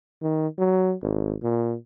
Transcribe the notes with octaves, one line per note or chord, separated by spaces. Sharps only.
D#3
F#3
G#1
A#2